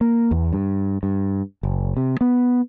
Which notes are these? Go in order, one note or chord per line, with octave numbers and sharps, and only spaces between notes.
A#3
E2
G2
G2
F#1
C3
B3